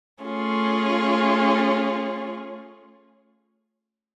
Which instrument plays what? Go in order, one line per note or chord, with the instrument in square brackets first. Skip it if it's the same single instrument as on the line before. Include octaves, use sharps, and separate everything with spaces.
[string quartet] A3 C#4 F4 G#4